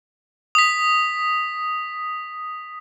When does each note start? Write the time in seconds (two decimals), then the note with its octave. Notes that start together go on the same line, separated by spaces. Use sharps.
0.55 D#6 B6